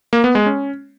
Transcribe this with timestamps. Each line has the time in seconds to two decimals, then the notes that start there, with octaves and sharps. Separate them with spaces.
0.13 A#3
0.24 B3
0.35 G#3
0.46 C#4